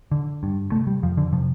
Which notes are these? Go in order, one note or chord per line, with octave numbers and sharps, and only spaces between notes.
D3
G2
C3 A3
G3
F2 F3
D3
C3 F3